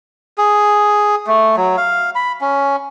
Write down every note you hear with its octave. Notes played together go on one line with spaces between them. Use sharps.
G#4
A3
F#3
F5
B5
C#4